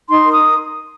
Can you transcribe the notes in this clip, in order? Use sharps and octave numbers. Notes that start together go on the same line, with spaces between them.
D#4 C6
A#4
D#6